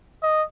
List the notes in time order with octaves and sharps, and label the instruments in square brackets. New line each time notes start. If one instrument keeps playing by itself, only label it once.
[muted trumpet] D#5